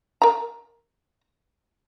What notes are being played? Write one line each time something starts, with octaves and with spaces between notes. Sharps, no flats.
A#4 A#5